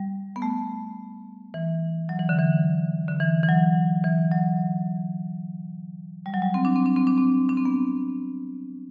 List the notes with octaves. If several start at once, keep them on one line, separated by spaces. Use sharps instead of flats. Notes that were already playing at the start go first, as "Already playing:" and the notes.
Already playing: G3
B3
A3
E3
F#3
E3
D3
E3
D3
E3
E3
F#3
E3
F#3
G3
F#3
G3
C4
D4
C4
D4
C4
D4
C4
D4
C4
B3